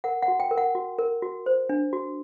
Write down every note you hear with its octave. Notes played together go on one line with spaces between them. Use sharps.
A#4 F#5
F#5
F#4
G5
A#4
F#5
F#4
A#4
F#4
C5
D4
F#4